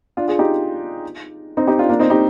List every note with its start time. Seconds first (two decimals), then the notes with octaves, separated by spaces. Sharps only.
0.17 D4 F4
0.28 F4 G#4
0.39 D#4 G4
1.57 C4 D#4
1.67 D#4 G4
1.79 D4 F4
1.89 A#3 D4
2.00 C4 D#4
2.10 D#4 G4